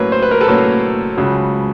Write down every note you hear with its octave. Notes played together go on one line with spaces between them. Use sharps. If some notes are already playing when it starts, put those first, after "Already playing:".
Already playing: A2 F#3 A#3 C#4 B4 C#5
C5
B4
A#4
A4 B4
A2 F#3 A#3 C#4
C#2 C#3 F#3